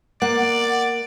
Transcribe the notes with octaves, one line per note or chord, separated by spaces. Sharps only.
A#3 D5 F#5